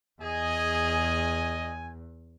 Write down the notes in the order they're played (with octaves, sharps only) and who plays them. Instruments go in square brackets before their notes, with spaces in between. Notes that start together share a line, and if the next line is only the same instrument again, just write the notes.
[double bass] E2 [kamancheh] G#4 [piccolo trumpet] D#5 [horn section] G#5